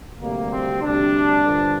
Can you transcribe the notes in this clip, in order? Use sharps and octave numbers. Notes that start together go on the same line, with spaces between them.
D2 C3 G3 A#3
C4
D2 C3 G3 D4
G2 D3 F3